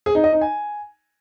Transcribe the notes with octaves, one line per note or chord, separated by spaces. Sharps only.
G#4
D#4
D#5
D#4
G#5